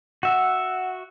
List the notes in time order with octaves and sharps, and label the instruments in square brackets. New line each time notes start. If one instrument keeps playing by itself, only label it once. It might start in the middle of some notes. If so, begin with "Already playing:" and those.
[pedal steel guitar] F#4 E5 [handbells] F#5